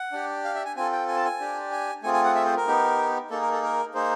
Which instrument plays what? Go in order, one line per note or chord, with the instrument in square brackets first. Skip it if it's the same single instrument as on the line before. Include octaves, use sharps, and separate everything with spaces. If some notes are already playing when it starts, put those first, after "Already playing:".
Already playing: [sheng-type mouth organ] F#5
D4 G4
F5
E5
G#5
C4 F4 A4 G#5
G5
G#5
A5
G#5
D4 G4
G#5
A3 C4 F4 G#4 G#5
G#5
F#5
E5
C5
A#4
B3 D#4 G4
A#3 D#4 G#4 A4
A#4
A4
A#4
A#3 D#4 G#4 C5